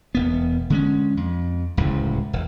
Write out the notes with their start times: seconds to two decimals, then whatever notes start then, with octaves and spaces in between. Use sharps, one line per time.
0.15 E1 B3
0.70 D3 G#3 C#4
1.17 F2
1.77 D1 C#2 A2
2.33 E1